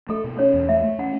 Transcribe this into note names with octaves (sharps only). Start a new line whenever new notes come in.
A3 A4
B2
C#4 C#5
E2
A3 E5
A3
C#4 F#5